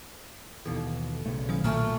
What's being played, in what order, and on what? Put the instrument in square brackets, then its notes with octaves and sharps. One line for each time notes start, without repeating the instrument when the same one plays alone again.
[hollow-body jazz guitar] D#2 B2 E3 [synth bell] A4
[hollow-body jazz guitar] B1 [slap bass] C#3 A3
[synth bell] D#3 F#3 D#6
[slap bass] A#2 [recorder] A3 [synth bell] G#5 A#5 F6